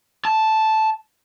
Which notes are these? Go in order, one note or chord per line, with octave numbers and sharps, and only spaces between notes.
A5